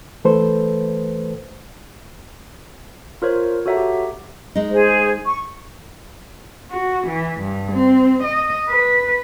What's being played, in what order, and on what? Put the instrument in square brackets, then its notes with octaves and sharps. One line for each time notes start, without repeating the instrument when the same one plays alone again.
[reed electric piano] E3 A3 A4 B4 C5
[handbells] F4 A#4 C5 C#5
F#4 A4 C#5 E5 F#5 A#5
G4
[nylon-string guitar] G#3 D#4
[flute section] G#4 C5
C#6
[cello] F#4
E3
G2
C4
D#5
B4